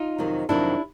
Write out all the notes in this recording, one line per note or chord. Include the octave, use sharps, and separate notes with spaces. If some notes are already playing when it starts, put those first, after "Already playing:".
Already playing: D#4 F4
F2 C3 D#3 F#3
F2 C3 D#3 F#3 D4 E4